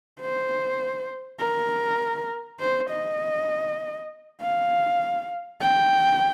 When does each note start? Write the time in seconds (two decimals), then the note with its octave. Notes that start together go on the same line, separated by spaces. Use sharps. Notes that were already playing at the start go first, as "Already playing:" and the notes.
0.21 C5
1.40 A#4
2.60 C5
2.90 D#5
4.41 F5
5.61 G5